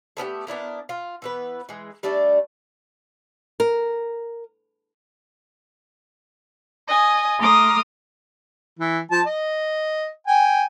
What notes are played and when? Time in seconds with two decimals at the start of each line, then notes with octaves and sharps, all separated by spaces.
0.17 A3 B3 C#4 G4
0.47 B3 D4 E4 A#4
0.89 F4
1.22 E3 B3 B4
1.69 E3 G#3
2.03 G3 A3 D4 D5
3.60 A#4
6.88 D#5 G#5
7.39 A3 A#5 C6 D6 D#6 F6
8.79 E3
9.11 F3 A5
9.26 D#5
10.27 G5 G#5